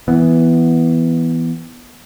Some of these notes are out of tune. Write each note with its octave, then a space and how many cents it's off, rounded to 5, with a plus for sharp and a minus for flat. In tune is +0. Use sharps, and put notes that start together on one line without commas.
E3 +0 B3 +0